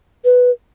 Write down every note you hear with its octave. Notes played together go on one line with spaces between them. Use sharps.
B4